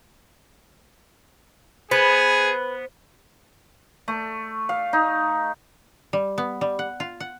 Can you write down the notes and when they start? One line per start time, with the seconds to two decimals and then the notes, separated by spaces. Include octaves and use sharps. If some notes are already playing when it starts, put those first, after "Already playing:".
1.91 B3 G#4 B4 C5
4.08 A3
4.69 F5
4.93 D#4
6.13 G3
6.38 B3
6.61 G3
6.79 F#5
7.00 F4
7.20 F#5